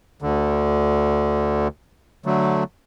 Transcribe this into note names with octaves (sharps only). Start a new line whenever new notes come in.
D2 D3
D3 F#3 A3